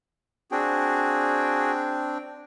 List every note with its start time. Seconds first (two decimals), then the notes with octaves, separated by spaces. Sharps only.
0.52 C4 D4 F#4 G#4 G5